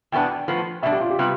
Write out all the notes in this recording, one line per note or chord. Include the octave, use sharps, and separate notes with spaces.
E2 B2 B3 D4 G5
A2 F3 B3
B2 G3 D4 E5
G4
F4
G4
C3 G3 B3